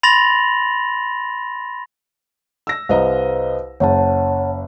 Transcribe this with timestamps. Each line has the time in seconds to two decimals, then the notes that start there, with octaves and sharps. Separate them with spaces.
0.03 B5 C6 A6 A#6 F7 F#7
2.67 E6 A#6
2.89 C2 B4 C5 D#5 F5 A#5
3.80 F#1 C#5 F#5 A5